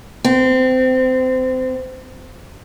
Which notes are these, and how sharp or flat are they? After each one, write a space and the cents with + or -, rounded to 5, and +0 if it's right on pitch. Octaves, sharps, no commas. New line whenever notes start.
C4 -25